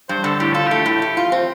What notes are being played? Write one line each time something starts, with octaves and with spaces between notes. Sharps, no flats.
G2 C5
D3 A4
A2 G4
F4 A4
A3 G4
A2
A3
F4
C4